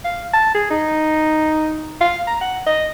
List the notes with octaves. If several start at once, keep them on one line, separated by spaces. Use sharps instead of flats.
F5
A5
G#4
D#4
F5
A#5
F#5
D#5